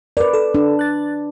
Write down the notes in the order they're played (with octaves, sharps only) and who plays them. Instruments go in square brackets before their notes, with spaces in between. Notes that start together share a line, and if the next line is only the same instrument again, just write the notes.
[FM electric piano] A#4 [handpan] B4 D5
[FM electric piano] A4
[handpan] D4
[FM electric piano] F#6 A6